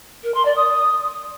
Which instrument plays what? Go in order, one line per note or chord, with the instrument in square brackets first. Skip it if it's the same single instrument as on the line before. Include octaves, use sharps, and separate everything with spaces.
[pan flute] A#4
C6
D5
D#6